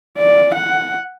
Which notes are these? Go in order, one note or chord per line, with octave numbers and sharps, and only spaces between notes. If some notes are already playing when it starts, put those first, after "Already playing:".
D5
F#5